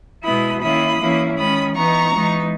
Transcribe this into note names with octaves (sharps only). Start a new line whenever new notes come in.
B2 G#3 B3 E4 B5 D#6
D#3 A#3 C#4 E4 B5 D#6
E3 A#3 C#4 E4
D#3 G#3 C#4 B5 D#6
E3 B3 D#4 A#5 C#6
E3 G#3 B3 D#4